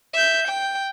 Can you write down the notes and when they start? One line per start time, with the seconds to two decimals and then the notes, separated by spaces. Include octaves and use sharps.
0.14 E5 G6
0.48 G5